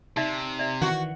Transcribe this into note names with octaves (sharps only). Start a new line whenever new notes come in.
C3 D#4 D5 E5
D5 E5
D#3 E3 F#4